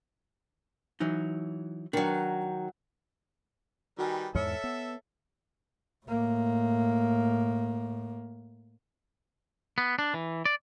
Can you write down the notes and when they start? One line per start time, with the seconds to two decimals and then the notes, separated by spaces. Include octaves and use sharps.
1.00 E3 F#3 D#4
1.93 D#3 F#3 D4
3.99 D#3 G3 F#4 B4 G5 G#5
4.35 E2 G#2 E3 A4 C#5 E5 F6 C#7
4.64 B3
6.06 A2 A#3
9.78 B3
9.99 D4
10.14 E3
10.45 D5